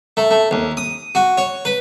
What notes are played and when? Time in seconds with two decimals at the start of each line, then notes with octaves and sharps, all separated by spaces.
0.17 A3
0.31 A3
0.51 D#2
0.77 D#6
1.15 F#4
1.38 C#5
1.65 B4